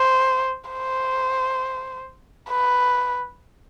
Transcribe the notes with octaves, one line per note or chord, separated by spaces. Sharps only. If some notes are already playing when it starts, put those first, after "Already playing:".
Already playing: C5
C5
B4